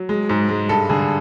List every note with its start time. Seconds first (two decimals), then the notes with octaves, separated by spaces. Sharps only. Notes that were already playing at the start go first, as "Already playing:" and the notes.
Already playing: F#3
0.09 G#3
0.29 G#2
0.49 G#3
0.69 G2 A4
0.89 D3 G#4